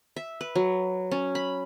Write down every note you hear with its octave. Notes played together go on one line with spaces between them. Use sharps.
E5
B4
F#3
C#4
B5